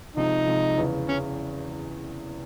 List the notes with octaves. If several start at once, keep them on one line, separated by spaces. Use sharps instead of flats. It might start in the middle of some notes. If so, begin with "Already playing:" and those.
C3 F3 G#3 D#4
C3 F3 G#3
E2 C#3 E3
C#3 E3 C#4